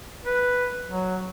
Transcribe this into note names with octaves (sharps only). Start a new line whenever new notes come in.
B4
F#3